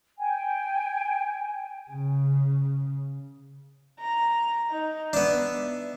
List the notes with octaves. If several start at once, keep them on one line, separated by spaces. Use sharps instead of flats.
G5 G#5
C#3
A#5
D#4
B3 D4 E5